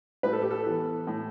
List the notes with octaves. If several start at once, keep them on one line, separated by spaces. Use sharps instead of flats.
A2 B4
A4
G4
A4
E3 B3
A2